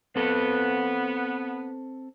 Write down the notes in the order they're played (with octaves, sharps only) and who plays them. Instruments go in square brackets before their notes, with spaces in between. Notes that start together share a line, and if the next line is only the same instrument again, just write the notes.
[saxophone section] B3 [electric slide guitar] C4 A4